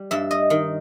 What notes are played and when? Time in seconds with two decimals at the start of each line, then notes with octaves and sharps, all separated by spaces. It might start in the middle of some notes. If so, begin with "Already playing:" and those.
Already playing: G3
0.11 G2 E5
0.31 D#5
0.50 D#3